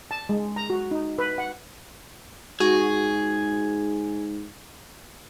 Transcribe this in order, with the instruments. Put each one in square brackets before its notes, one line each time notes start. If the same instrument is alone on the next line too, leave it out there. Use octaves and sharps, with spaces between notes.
[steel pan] A5
G#3
A#5
F#4
D#4
B4
F#5
[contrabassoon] G#2 [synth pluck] F#4 [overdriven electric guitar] G#4